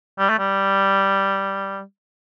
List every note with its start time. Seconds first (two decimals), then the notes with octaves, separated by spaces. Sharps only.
0.19 G3
0.30 A3
0.39 G3